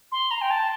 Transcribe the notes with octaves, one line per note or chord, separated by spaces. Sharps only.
C6
A#5
G5
A5